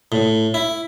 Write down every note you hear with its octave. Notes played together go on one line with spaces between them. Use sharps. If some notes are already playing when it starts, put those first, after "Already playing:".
A2
E4